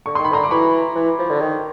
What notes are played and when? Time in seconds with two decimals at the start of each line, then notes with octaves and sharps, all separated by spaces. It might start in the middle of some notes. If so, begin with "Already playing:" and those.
0.06 D3 C#6
0.15 D#3 C6
0.24 B5
0.31 D3 A#5 C6
0.44 D6
0.51 E3 B5 C#6
0.95 E3
1.19 F3
1.30 D3
1.40 D#3